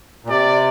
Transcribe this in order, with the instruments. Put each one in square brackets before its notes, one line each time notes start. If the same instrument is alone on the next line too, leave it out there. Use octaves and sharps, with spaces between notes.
[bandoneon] A#2
[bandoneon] C3 [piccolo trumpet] D5